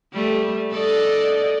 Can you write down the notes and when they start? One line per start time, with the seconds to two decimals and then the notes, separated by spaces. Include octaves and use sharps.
0.13 G3 A3
0.72 A4 D5 D#5